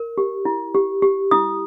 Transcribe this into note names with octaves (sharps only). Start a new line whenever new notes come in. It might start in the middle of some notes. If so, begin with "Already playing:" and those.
Already playing: A#4
G4
E4
G4
G4
E4 D#6